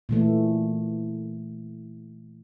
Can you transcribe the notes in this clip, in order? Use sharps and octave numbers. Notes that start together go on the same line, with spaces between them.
A#2 E3 A3